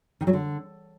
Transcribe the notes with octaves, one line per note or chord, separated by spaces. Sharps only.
D#3
F#3
D3